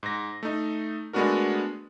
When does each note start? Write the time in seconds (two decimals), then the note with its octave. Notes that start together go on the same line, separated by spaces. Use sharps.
0.03 G#2 A#6
0.43 A3 D#4
1.13 G#3 A3 B3 D4 F#4 A#4